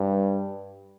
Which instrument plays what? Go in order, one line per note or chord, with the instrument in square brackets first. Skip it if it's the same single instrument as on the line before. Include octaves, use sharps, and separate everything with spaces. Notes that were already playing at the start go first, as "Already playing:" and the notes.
Already playing: [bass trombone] G2